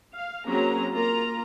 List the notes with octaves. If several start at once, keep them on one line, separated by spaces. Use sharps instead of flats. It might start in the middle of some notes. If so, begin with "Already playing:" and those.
F5
F#3 A#3 C4 C#4 G#4 A#5
A#3 F4 A#4 A#5